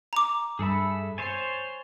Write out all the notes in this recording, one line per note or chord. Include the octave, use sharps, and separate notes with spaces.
A#5 D6
G2 G#4 A4 E5 B5
C5 C#5 G#5 A6 C7